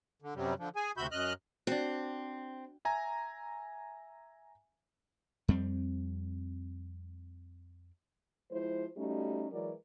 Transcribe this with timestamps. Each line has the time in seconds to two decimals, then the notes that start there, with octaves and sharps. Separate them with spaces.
0.22 D3
0.35 F#2 C3 F#3 G3
0.58 D3 F3
0.76 G#4 G#5
0.97 D2 C3 F#4 E5 B5 G6
1.11 F#2 D#5 F6 F#6
1.67 C4 D4 F#4
2.85 E5 G#5 A#5
5.48 F2 G3 C4
8.51 F3 G#3 E4 C5
8.97 G3 A3 C#4 D#4 F#4
9.51 E3 F#3 G#3 A#4 D5